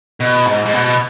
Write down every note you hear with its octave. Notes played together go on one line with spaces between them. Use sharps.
B2
G#2
G#2
B2